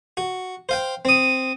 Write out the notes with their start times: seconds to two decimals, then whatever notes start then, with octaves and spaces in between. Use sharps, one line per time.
0.17 F#4
0.69 C5 F5 G5
1.05 C4 D#6